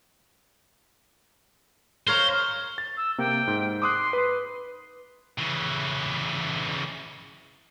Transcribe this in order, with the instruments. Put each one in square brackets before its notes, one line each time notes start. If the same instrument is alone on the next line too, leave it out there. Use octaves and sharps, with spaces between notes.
[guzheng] A#4 C#5 F5 [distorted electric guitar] C5
[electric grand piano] A6
[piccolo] E6
[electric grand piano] C3 A#3 [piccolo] G5
[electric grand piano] G#2
[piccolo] C6 [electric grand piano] D6 D#6 F#6
[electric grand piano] B4
[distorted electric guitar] C#3 E3